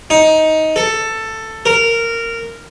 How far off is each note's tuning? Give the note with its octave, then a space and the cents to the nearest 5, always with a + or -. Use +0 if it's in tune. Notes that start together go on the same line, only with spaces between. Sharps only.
D#4 +15
A4 +10
A#4 -15